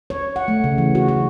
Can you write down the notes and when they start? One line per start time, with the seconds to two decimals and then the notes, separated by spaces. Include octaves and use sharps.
0.10 C#5
0.36 F#5
0.48 A3
0.64 C#3
0.78 E3
0.95 F#4
1.08 F#4